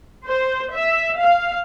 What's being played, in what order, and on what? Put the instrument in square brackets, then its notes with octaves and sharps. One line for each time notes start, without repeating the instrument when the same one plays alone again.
[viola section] C5
E5
F5